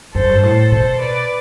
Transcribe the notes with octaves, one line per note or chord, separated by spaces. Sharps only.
F#2 A4 C5
G2
A2 A4 C5
B2 A4 C5
B4 D5